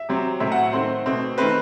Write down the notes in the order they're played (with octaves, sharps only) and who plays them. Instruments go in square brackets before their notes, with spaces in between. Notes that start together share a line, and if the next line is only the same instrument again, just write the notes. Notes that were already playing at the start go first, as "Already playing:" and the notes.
Already playing: [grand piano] E5
C3 F#3 C4
A2 F#3 A3 C4 E5
F#5
D#3 A3 C4 C5
B2 A3 C4
D#3 A3 C4 B4